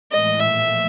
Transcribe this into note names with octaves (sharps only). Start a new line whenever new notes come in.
A2 E3 G#3 D#5
A#2 F3 A3 E5